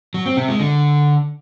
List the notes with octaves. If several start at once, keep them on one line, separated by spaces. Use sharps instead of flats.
F#3
C4
C3
G#3
D3